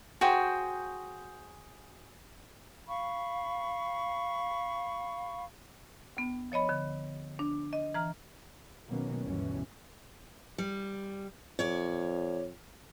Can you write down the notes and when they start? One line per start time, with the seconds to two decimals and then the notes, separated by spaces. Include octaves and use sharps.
0.21 F#4 G#4 C5 G5
2.88 F5 B5 C#6
6.17 D2 B3
6.52 F3 C#5 D#5 B5
6.69 D3
7.39 D4
7.73 D#5
7.94 E3 A#5 F6
8.87 B2 D#3 F#3 A#3 B3 C#4
9.23 G1 D2 G2 B2 E3 C#4
10.58 G3
11.59 F2 C#5 D5